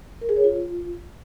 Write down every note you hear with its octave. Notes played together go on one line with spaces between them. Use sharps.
A#4
G#4
C#5
F4